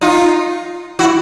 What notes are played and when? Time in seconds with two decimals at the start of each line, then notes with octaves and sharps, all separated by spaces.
0.01 D#4 F4
0.99 E4 F#4